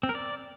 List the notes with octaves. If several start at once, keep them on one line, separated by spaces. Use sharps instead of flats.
C4
A#4
D5